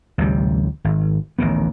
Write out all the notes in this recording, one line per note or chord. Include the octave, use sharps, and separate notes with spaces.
A1 D2 C3 G3
G#1
A1 D2 D#3 B3